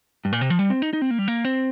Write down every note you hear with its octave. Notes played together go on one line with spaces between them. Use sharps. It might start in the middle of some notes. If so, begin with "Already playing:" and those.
G2
A#2
C3
F3
G3
C4
D#4
D#4
C4
A#3
G3
A#3
C4